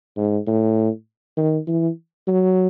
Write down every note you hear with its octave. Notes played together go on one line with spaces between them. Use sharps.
G#2
A2
D#3
E3
F#3